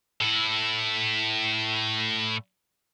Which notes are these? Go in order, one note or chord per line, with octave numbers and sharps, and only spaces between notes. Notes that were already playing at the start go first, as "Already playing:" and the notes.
A2 E4